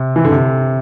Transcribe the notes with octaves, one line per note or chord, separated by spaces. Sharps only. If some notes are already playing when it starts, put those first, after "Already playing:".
Already playing: C3
E3
D3
C3